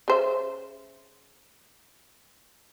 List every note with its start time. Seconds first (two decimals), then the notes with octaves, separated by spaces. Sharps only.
0.08 C#3 C5 E5